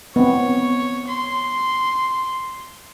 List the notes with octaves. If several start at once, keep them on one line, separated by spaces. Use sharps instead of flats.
B3 C4 C#5
C6